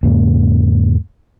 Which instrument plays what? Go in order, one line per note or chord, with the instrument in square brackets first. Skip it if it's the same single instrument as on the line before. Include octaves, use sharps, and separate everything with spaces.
[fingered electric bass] E2 G#2 C#3 A#3